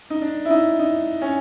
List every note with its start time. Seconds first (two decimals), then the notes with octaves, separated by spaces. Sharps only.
0.10 D#4
0.22 D4
0.45 E4
0.50 D#4
0.79 D#4
1.22 C#4